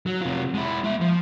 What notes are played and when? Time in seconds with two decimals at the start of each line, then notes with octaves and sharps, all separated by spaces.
0.06 F#3
0.21 C3 F4
0.54 G#3 E4
0.84 G#3 E5
1.01 F3